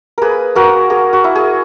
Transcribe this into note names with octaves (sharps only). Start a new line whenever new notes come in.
A#3 G#4 A#4 B4
A#3 F#4 A#4
A#3 G#4
F#4
E4
G#4